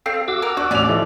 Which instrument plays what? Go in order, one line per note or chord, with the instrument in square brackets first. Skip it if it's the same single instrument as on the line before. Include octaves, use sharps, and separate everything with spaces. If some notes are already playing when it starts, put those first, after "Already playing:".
[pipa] C4 [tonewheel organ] A4 F5
[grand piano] F#4 [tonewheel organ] D6 E6
[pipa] A#4
[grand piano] D4 F#6 [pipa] F#4
[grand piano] A1 F7 [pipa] C#4 D5
[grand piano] F3 D#4 E4 [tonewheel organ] A4